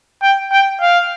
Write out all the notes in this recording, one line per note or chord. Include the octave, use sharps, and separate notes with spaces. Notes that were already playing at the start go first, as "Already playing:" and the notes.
G5
G5
F5